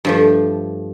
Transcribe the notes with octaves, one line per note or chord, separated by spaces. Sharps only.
G2 F3 A3